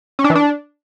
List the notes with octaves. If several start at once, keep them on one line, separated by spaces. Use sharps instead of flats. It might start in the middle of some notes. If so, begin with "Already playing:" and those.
C#4
D4
E3
D4